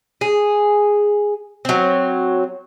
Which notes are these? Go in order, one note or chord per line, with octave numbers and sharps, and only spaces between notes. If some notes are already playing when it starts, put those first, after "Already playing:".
G#4
F#3 C4